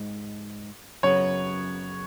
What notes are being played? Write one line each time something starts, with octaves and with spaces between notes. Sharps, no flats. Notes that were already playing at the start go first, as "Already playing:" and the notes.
Already playing: G#2 G#3
F#2 C#3 F#3 B3 C#5